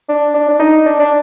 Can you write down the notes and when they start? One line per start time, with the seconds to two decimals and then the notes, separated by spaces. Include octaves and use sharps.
0.09 D4
0.34 D4
0.49 D4
0.59 D#4
0.86 D4
0.99 D4